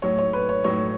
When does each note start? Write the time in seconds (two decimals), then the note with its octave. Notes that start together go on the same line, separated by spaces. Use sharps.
0.02 A2 F#3 C#5
0.18 C#5
0.33 B4
0.49 C#5
0.64 A2 F#3 C#5